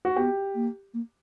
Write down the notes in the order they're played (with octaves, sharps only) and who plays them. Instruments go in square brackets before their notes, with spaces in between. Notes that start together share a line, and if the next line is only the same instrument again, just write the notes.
[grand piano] F#4
[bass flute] B3 [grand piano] G4
[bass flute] A#3
A#3